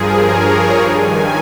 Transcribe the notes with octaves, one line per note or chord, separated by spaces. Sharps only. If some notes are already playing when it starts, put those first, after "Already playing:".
Already playing: G2 F3 G#4 A#4
C#5
G2 D#3 G#5